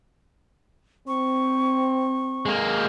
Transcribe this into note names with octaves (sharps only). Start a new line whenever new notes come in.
C4 C#6
G#3 A#3